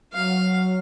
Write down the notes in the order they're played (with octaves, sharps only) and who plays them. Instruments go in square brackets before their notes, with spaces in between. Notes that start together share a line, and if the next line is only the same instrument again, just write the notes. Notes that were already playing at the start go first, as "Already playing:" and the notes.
[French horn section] F#3 [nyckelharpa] F5